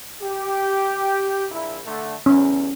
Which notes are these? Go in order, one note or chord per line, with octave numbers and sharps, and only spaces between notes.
G4
A#1 E4
D3 A3
A1 E2 C#4